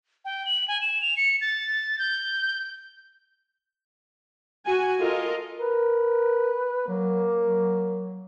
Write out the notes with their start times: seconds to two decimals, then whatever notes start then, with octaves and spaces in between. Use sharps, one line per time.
0.25 G5
0.46 F#7
0.68 G#5
0.81 E7
1.02 F7
1.17 C#7
1.41 A6
1.99 G6
4.66 F#4 G#5
4.99 F4 A4 A#4 D#5
5.60 A#4 B4
6.88 F#3 A#3
7.46 F#3